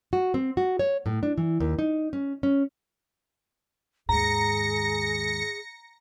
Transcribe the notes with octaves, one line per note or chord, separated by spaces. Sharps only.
F#4
C4
F#4
C#5
A2
D4
E3
D#2
D#4
C#4
C#4
D#2 G#2 G#4 A#5 A#6 C#7